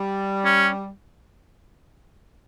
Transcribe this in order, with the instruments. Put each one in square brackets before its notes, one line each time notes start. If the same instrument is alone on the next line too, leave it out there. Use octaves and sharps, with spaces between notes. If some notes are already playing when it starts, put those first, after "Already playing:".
Already playing: [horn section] G3
[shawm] C#4